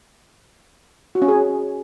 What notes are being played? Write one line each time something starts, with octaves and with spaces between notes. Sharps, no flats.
F#4
C#4
G#4